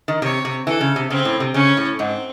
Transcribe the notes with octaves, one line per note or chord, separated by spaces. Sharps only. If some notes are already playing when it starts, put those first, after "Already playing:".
D#3
C3 C#5
C3
E3 A4
C#3
C3
C#3 C4
A2
C3
C#3 C#4
A2
G#2 C4